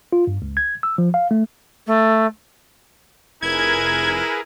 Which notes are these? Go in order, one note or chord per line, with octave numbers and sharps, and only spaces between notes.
F4
G2
C#2
G#6
E6
F3
F5
A3
A3
F1 E4 G#4 A#4 B4 G#6